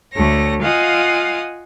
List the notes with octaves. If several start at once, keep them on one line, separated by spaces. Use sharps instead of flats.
D2 A3 C#5 A#6
F4 D#5 F5 F#5 G#5 D#6